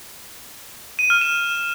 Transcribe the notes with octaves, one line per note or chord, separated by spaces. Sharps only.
D#7
F6
E7